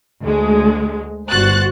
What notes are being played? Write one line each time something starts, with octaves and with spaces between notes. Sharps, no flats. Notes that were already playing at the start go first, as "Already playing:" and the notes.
D2 G#3
G1 G2 F#4 C5 F#6 A6